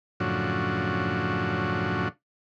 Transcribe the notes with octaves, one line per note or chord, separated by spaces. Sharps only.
F#2 A2 C#3 F3 D4 F#4